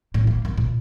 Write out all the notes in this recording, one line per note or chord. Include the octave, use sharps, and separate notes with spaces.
A2
A#3
D#3
A#2